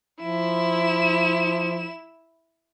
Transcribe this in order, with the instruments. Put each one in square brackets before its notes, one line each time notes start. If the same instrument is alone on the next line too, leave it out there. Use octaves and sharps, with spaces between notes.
[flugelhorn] F3 [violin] E4 E7